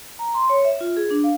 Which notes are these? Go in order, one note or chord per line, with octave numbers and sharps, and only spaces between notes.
A#5
C6
C#5
E5
F4
G#4
D4
F5